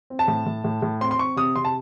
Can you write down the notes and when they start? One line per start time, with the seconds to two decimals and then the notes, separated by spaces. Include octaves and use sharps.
0.10 C4
0.19 A5
0.28 A2
0.46 A2
0.64 A2
0.82 A2
1.01 C4 C6
1.11 C6
1.19 C4 C#6
1.36 C3 D#6
1.56 C3 C6
1.65 A5